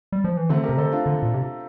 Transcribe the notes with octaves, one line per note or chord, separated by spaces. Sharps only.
G3
F3
E3
D3 A3 C4
G4 A#4
C3
D3 A4 C5
D4 F4
D3
A#2
C3